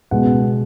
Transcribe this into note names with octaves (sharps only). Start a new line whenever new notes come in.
C#2 B2 G#3 F#5